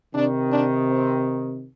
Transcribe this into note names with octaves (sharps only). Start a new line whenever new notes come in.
C3 D#3 D4
D4
C4